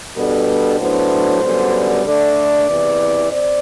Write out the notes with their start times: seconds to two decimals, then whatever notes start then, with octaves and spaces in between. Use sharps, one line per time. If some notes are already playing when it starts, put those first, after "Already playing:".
0.16 B2 G3 B3 D4 A4
0.80 A2 F#3 B3 D4 C5
1.42 F#2 D3 G3 B3
2.05 D3 A3 D4 D5
2.68 E2 C3 E3
3.30 C4 D5